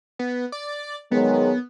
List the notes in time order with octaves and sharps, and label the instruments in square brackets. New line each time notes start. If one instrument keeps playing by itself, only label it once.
[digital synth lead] B3
D5
[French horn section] D#3 F#3 G#3 [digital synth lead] B3